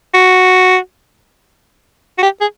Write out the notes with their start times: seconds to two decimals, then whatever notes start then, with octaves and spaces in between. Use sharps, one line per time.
0.14 F#4
2.18 F#4
2.23 G4
2.41 G#4